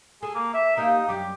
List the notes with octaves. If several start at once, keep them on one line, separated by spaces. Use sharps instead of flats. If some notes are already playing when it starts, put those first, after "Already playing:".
G#4 A4
A#3
E5
A#3 D#4 G4 F5
F#2 G3 G4